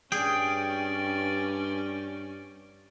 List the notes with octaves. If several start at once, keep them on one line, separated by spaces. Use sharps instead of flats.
G2 C#4 G#4 D5 G5